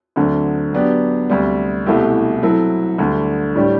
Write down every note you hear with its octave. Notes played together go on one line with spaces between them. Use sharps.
D2 D3 F#3 C4
F#3 B3 D4 G4
D2 C3 G3
C2 B2 A3 E4 G4
F#3 C4 E4 A4
D2 D3 G3
A2 G3 D4 G4